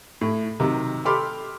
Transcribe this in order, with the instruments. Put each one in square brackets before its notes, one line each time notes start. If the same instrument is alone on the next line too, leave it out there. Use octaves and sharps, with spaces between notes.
[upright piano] A2
C3 D#3 F#3
G4 A4 B5 C6 D6 F6